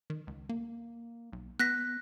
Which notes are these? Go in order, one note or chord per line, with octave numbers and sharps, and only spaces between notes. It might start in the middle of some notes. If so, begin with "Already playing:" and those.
D#3
C#2
A#3
B1
B3 F#6 A#6 B6